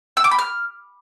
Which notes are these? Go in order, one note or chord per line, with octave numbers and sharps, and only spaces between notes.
E6
D6
B5
F6